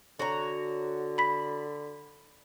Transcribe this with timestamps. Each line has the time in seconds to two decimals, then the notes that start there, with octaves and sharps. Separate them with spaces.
0.19 D3 F#4 C#5 A#5
1.18 B5 B6